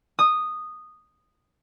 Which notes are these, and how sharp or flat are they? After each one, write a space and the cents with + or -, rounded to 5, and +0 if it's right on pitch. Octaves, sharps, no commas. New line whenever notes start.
D#6 -10